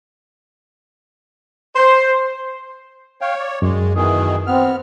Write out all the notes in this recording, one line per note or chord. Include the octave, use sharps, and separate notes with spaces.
C5
C#5 F5 G5
D5
F#2 G#3
B2 D#3 E3 G#4
B3 C4 F6